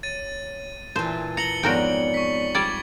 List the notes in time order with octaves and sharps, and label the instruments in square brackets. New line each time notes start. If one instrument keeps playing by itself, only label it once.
[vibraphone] C#5 [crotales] A6 D#7
[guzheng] A#2 E3 [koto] C5 [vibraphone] A5
[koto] A#5 [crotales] C#7 F#7 G7
[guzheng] F2 G#2 [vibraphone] B3 C#5 D5 [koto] F#4 A#4 G5
[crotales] C#6 B6
[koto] G3 D5 [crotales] G#6